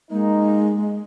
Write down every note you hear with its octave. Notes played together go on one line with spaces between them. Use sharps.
G#3 A#3 D#4